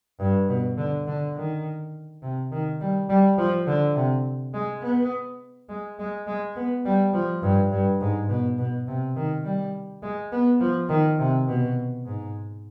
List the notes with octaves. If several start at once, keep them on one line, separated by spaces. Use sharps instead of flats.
G2
B2
D3
D3
D#3
C3
D#3
G3
G3
F3
D3
C3
G#3
B3
G#3
G#3
G#3
B3
G3
F3
G2
G2
G#2
B2
B2
C3
D#3
G3
G#3
B3
F3
D#3
C3
B2
G#2